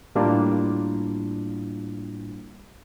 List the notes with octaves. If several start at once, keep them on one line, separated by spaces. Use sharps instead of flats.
A2 G3 A#3 D4 E4 F4